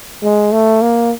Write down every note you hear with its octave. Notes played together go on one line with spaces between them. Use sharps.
G#3
A3
A#3